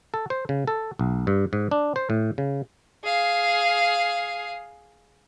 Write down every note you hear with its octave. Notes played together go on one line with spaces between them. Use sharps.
A4
C5
C#3
A4
B1
G2
G#2
D4
C5
A2
C#3
G#4 F5